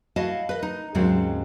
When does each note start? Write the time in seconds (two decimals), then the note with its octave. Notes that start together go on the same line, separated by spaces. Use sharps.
0.16 E4 F#4 D#5 F5 A5
0.49 B4 D#5
0.62 D#4
0.95 D#2 G#2 C#3 F#3 G#3 C4